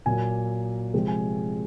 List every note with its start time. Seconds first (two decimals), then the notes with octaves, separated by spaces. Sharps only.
0.06 A#2 F#3 A#3 G#5
0.94 C3 F3 G#3 C4
1.08 G#5